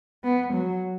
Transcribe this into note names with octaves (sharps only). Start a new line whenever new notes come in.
B3
F#3